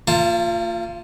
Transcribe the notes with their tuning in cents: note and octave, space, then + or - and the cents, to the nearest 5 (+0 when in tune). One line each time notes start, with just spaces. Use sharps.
A#3 -40 F4 +0 A5 +0